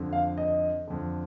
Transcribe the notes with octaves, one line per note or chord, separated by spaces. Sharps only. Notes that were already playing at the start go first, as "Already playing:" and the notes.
Already playing: F2 D3
F5
D#5
F2 D3